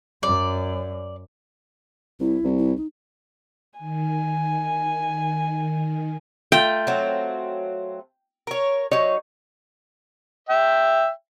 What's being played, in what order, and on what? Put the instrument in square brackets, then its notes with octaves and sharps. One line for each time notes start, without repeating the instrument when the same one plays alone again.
[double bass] F#2 [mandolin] D5
[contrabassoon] C2 [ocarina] E4
[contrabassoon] C2
[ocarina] E4
D#4
[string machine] D#3 [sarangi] G#5
[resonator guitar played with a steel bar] A3 F4 [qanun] G5
[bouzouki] F#3 C4
A#4 C#5
[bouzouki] F#3 D#4 [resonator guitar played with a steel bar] C#5
[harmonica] E5 G5